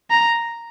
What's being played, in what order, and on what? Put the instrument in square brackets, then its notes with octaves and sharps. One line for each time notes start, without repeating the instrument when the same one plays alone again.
[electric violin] A#5